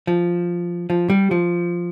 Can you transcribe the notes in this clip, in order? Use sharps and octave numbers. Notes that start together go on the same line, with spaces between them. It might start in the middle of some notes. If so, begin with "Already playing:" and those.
F3
F3
G3
F3